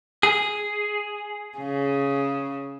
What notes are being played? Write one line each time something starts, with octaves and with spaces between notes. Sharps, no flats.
G#4
C#3